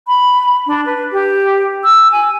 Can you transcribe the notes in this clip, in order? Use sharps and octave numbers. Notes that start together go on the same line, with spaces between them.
B5
D4
B4
G4
E6
G#5